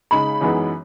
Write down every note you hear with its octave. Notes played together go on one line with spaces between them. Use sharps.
C#3 G#3 D#4 B5
F#2 E3 G#3 B3 D#4